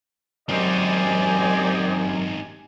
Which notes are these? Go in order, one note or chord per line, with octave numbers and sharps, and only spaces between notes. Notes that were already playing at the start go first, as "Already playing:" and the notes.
F#2 C4 D#4 G4 C5 D5 D#5 G#5